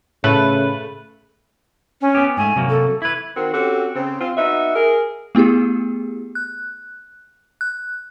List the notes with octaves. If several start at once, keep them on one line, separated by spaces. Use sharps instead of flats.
A2 C#3 A3 B4
C#4
B3 G4
G#2 A3 G#5
C3 F#3 A#3
A4
E4 B4 G#6
D#3 C4 F#4 A#4 C5
C4 C#4 F#4 G4 A4
C#3 C4
C4 F4
B3 D#4 F#4 E5
G#4 A#4
A3 B3 E4 G4 G#4
F#6
F#6